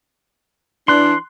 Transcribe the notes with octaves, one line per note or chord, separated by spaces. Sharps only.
E3 D4 C6 F#6